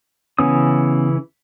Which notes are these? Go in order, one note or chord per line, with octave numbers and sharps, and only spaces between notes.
C#3 E3 B3 C#4 D#6